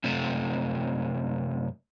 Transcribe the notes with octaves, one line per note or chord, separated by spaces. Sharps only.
F#2 C3 A3